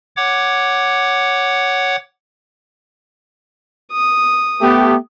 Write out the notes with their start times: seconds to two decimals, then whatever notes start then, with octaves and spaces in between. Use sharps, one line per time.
0.16 C#5 F#5 D6
3.92 D#6
4.61 A3 B3 G4